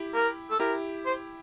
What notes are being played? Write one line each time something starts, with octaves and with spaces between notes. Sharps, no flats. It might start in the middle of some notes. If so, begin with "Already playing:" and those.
Already playing: E4 G4
A#4
A4
E4 G4 A#4
C5